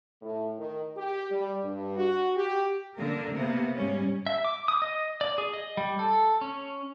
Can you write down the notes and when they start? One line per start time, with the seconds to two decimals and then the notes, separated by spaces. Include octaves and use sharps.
0.21 A2
0.58 D#3
0.96 G4
1.31 G3
1.63 G2
1.96 F#4
2.36 G4
2.97 D3 A#3 A#4
3.32 C3 A#3 B3
3.74 G#2 G3 C#4
4.27 E5
4.45 D6
4.68 D#6
4.82 D#5
5.21 D5
5.38 G#4
5.53 D#5
5.77 G3
5.99 A4
6.41 C#4